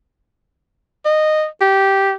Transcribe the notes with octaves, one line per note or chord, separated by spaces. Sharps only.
D#5
G4